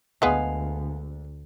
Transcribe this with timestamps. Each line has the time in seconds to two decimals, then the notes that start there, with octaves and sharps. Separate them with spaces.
0.22 D2 G#3 B3 F5 G#5